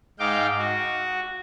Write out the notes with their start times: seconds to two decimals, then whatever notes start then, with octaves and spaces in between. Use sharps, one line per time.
0.19 G#2 D#4 F5 G5 D6
0.59 F#4